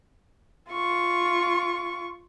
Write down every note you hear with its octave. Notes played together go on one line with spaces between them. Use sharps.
F4 C#6